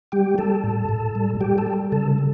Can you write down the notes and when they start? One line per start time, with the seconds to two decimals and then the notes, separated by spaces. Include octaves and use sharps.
0.12 G3 G4 G5
0.38 G3 A4 A5
0.64 A2
0.89 A2
1.15 G3
1.40 G3 G4 G5
1.58 A4 A5
1.66 G3
1.92 C#3 A4 A5
2.18 G3